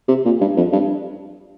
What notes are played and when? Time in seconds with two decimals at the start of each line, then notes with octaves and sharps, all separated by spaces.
0.08 C3
0.25 A#2
0.41 G2
0.57 F2
0.73 G2